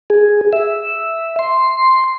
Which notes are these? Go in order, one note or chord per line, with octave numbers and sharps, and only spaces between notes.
G#4
E5
C6